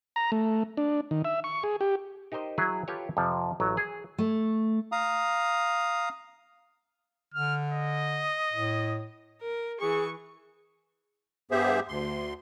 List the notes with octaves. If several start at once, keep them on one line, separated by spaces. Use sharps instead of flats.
A#5
A3
D4
D#3
E5
C#6
G#4
G4
D#4 G4 A#4 C5 D#5
F#3 E4 G#4
F4 G4 A4 B4 C#5
F2 C3 F3
A1 F#3
G#4
A3
F5 A#5 D#6
D3 F6
D#5
A2
A#4
E3 G#4 C#6
G2 B3 G4 G#4 C5 E5
D2 C6